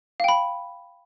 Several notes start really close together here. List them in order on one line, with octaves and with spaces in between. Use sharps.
F5 G5 B5